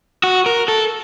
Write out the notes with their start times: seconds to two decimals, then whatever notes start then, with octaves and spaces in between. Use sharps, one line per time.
0.24 F#4
0.46 A#4
0.68 A4